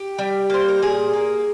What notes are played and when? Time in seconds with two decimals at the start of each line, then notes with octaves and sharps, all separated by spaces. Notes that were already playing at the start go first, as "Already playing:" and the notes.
Already playing: G4
0.19 G3
0.50 A#3 C5
0.68 A#4
0.82 A#2 G#4
1.13 A#3